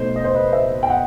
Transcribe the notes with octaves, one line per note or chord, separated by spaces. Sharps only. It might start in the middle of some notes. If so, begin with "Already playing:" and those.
Already playing: B2 A3 D#4 C5
D#5
C5
B4 D#5
C5 E5
G5
D#5 F#5